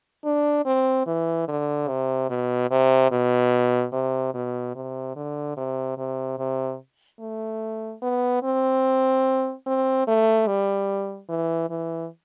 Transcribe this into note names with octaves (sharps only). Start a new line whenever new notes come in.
D4
C4
E3
D3
C3
B2
C3
B2
C3
B2
C3
D3
C3
C3
C3
A3
B3
C4
C4
A3
G3
E3
E3